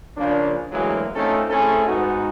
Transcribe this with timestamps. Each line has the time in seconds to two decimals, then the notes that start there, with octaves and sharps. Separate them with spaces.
0.17 C#3 F3 A#3 D4
0.72 D2 E3 F#3 G#3 A#3 G#4
1.16 A3 C4 C#4 D#4 F4 A4
1.50 A3 C4 C#4 E4 G#4 A4
1.86 G#2 B3 D#4 F#4